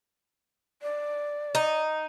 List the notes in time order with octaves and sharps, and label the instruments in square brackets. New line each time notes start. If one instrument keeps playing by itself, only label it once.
[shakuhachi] D5
[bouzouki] D#4